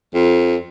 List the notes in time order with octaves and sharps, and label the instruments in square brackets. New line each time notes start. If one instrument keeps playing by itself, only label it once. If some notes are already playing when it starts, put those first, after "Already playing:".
[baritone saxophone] F2